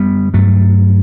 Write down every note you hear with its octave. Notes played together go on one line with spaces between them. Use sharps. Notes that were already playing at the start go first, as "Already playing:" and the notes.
Already playing: F#2 G3 B3
G2 F#3 A3